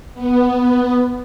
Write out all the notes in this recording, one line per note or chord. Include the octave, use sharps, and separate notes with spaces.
B3